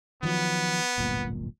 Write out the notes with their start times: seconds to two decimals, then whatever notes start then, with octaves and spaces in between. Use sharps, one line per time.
0.23 D#3 F3 F#3 B3
0.98 D1 G1 A#2